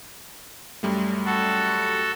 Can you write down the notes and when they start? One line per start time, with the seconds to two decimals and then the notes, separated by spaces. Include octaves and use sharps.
0.83 F#2 G3 A3
1.26 F#4 A4